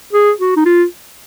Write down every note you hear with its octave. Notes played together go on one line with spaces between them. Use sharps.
G#4
F#4
D#4
F4